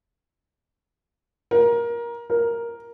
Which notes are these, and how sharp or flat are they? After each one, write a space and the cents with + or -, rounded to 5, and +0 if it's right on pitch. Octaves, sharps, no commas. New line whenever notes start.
A#4 +20
A#4 +5